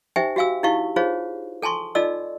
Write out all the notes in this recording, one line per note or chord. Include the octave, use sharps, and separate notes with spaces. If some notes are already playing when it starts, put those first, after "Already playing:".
D#4 G4 C5 E5 G5 G#5
F#4 G4 F5 G#5 E6
D#4 E4 G4 F5 C#6
D#4 F4 G#4 C5 C#5 F5
A4 G#5 A5 C6 C#6
D#4 F4 A4 D5 D#5 E6